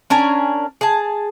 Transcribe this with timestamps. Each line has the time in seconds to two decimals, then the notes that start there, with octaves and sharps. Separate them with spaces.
0.10 C#4 D4 A#4 G#5
0.81 G#4 A5